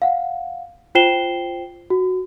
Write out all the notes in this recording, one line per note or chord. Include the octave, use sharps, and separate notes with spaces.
F5 F#5
F4 C5 G5 C7 E7 G7
F#4